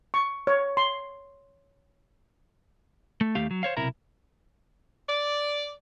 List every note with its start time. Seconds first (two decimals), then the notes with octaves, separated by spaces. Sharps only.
0.14 C#6
0.47 C#5
0.77 C6
3.21 A3
3.35 D#2 A3 G4 F5
3.51 F#3
3.63 C5 C#5 F5
3.77 B1 C3 E4 A#4 A#5
5.09 D5